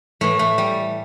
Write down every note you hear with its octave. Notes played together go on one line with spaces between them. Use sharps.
A2 E3 A3
A3
G3